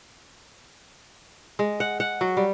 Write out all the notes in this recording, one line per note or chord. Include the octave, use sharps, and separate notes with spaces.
G#3
F#5
F#5
F#3
G3